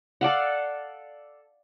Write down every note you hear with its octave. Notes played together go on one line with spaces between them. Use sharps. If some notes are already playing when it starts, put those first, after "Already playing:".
A4 D5 F5 F#5